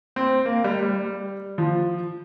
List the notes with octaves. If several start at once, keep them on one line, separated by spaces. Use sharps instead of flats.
C4
A#3
G3
G3
F3